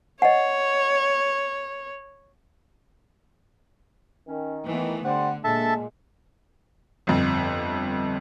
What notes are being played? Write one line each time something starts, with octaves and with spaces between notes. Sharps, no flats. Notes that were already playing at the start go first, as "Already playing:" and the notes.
C#5 D#5 F#5
D#3 C#4
E3 A3 B3 D#5
D3 G3 C5 F#5
A#2 G#3 D4 A4 E5 A5
G1 F2